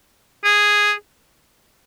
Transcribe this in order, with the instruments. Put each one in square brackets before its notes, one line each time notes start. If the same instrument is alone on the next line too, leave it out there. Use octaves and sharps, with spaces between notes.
[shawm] G#4